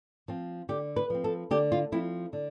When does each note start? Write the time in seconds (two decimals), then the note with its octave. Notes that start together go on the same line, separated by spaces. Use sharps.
0.28 F3 C4
0.69 D3 G4
0.96 B4
1.10 F3 C4
1.24 A4
1.51 D3 G4
1.72 F4
1.92 F3 C4 E4
2.33 D3